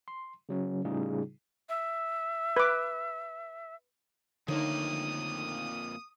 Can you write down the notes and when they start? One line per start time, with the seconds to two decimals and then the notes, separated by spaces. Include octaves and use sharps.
0.08 C6
0.49 C#3 F#3 C#4
0.85 A2 C#3 G3 D#4 F4 G#4
1.69 E5
2.56 B4 D6
4.48 F2 D3 D#3 F#3 A3 A#3 D#6